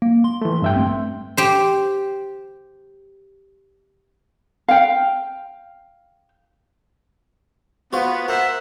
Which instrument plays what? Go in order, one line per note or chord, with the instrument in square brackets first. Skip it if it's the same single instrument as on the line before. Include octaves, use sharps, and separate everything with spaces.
[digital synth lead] A#3
C6
[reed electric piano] E3 A3
G2 E5 G5
[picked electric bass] A3 C4
[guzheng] G4 C5
[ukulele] F5 G5
[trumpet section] B3 [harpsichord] F4 F#4 C5
[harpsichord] A#4 [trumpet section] C5 E5 F#5